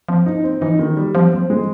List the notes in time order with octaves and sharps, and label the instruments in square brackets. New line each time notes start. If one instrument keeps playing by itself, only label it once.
[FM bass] F3 [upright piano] C4
[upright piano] D#4
C4
[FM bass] E3 [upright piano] D#4
[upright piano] D#3
G3
[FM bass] F3 [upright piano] C4
[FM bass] F#3 [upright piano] C4
[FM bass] F3
[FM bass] E3 [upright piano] G#3